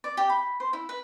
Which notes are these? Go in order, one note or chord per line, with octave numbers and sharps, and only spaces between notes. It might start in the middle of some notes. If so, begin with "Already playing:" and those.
D5
G4
B5
C5
E4
B4